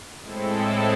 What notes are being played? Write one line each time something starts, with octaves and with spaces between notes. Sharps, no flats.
A2 G#3 C4 E4 A4